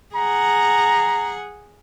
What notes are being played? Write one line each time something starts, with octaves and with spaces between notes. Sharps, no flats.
G#4 F#5 A#5